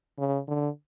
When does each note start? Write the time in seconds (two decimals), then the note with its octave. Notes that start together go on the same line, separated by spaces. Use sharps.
0.19 C#3
0.48 D3